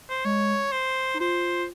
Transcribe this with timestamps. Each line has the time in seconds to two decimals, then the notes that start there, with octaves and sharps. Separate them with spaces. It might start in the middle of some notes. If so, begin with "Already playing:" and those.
0.09 C5
0.24 G#3 C#5
0.72 C5
1.14 D#4
1.20 F4 C5